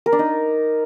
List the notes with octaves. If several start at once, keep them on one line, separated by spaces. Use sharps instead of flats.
A#4
D4
D#4